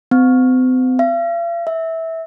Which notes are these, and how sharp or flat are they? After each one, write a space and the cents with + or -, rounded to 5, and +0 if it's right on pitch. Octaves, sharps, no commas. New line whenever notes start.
C4 -40
F5 -45
E5 -15